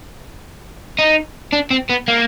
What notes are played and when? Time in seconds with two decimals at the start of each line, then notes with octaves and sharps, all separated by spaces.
0.99 D#4
1.52 D4
1.70 C4
1.89 B3
2.08 A#3